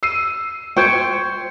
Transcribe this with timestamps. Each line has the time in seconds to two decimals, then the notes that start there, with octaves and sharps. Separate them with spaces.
0.03 E6 C7 D#7
0.77 C5 G5 C#6 G#6 C#7